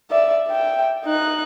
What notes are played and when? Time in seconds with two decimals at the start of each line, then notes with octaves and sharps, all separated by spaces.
0.11 D5 E5
0.47 E5 G5
1.05 D#4 F#6